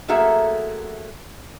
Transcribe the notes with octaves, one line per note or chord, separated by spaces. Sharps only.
F#2 A3 A#3 F#4 G#4 E5